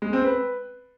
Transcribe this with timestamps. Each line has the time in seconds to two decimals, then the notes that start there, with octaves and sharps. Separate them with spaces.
0.02 G#3
0.13 C4
0.24 B4